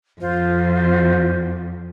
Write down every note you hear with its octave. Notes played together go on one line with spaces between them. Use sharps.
F2 F4 C5